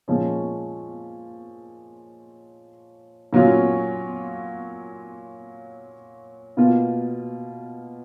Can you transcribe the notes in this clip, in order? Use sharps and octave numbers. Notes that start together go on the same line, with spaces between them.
A#2 F3 G#3 C#4
A#2 F#3 C#4 F4
B2 A#3 F4